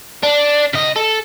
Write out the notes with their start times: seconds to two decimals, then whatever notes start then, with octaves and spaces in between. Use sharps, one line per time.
0.23 D4
0.74 C#3 D#5
0.96 A4